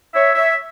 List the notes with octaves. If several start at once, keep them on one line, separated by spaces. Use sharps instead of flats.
C#5 E5
C#5 E5